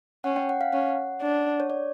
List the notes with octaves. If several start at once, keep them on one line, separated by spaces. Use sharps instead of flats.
C#4 F#5
G5
F#5
F5
C#4 F#5
D4
C#5
D5